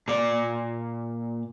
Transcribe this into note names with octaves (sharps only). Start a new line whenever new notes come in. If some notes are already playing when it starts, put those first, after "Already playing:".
A#2 D5